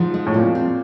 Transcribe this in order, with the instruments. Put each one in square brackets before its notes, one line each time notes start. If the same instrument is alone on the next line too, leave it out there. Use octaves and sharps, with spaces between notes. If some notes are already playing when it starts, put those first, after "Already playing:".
Already playing: [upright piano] G#2 [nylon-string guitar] F3
[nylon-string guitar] G#3
[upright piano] A2
[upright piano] A#2 [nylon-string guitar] C4
[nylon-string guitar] C4